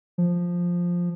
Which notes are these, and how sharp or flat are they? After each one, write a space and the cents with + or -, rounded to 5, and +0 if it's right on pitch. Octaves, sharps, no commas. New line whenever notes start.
F3 +5